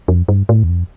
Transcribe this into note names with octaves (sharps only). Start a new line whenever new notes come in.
F2
G2
A2
E2
F2